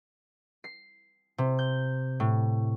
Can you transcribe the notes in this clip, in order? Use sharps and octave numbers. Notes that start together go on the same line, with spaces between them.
C7
C3
G6
A2